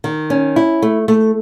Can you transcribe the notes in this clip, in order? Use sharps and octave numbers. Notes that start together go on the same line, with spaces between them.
D#3
C#4
E4
A3
A3